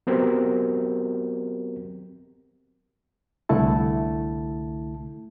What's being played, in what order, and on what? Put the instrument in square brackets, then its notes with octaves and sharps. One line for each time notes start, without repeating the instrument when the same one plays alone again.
[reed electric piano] F#3 B3 C4 F#4 G4 A#4
C2 D3 A3 E4 A5